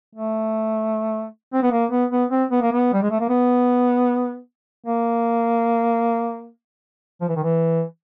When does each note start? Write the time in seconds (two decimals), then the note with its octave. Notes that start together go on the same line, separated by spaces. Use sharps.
0.15 A3
1.53 C4
1.62 B3
1.72 A#3
1.91 B3
2.11 B3
2.30 C4
2.51 B3
2.62 A#3
2.73 B3
2.93 G3
3.02 G#3
3.11 A3
3.20 A#3
3.29 B3
4.86 A#3
7.21 F3
7.29 E3
7.36 D#3
7.43 E3